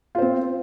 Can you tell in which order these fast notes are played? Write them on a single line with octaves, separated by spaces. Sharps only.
F4 C5 C4